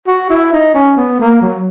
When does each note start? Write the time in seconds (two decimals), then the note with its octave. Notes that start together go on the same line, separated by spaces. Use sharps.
0.07 F#4
0.30 E4
0.53 D#4
0.74 C#4
0.97 B3
1.20 A#3
1.42 F#3